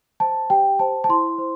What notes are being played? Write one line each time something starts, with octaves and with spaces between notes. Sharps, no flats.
C5 A5
G4 G5
C5 A5
A5
E4 C6
C5